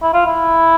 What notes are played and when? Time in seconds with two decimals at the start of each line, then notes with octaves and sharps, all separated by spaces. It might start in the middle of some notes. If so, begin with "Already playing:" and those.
0.02 E4
0.13 F4
0.26 E4